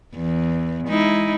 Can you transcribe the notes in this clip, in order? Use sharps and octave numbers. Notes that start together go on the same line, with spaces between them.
E2
G#3 D#4 E4